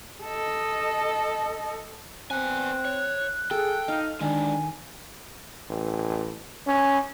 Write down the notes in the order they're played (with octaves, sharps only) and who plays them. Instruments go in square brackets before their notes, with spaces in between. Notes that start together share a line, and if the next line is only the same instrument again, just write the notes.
[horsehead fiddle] A4 D#5
[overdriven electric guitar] B3 G#5 [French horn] C4 [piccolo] F#6
[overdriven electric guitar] C#5
[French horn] G#4 [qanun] A4 [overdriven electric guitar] G5
[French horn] D#4 [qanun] F5 [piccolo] F6
[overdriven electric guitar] D3 G#3 [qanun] D#3 [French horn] D4 [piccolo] G#5
[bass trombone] A1
C#4